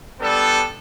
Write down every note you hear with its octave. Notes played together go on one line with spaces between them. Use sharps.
G3 B3 D4 A4